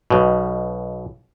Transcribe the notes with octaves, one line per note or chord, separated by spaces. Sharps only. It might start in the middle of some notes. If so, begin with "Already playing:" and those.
B1 B2